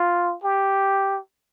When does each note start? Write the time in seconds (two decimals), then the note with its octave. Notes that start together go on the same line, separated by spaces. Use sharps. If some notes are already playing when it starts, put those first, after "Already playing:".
Already playing: F4
0.43 G4